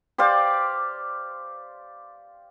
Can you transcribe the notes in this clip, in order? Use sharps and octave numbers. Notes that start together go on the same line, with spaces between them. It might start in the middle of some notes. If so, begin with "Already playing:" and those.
G4 C5 D5 F5